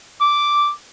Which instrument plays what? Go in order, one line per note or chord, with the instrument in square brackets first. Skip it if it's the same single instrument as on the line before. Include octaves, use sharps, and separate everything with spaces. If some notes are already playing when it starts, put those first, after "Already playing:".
[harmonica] D6